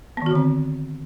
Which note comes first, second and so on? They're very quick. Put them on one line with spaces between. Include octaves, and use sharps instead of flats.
B3 D#3 F#4 D3 C4